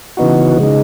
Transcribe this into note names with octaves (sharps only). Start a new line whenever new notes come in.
C#3 E3 B3 D#4 F#4
C#3 G#3 D#4